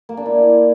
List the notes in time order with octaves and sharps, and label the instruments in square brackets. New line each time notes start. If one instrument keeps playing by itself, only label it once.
[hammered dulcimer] A#3
D4
E4